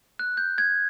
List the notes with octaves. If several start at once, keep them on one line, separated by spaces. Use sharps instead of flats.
F#6
G6
G#6